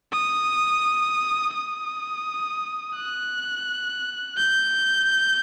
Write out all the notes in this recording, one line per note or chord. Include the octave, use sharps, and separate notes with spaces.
D#6
D#6
F#6
G6